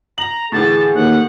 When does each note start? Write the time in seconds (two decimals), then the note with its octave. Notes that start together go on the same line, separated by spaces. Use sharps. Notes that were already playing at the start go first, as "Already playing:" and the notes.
0.18 A#5 F#7
0.52 A2 D3 E3 G#4 A5
0.94 D#2 F#5